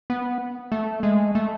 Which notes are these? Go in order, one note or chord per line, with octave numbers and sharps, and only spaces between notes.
B3
A3
G#3
A3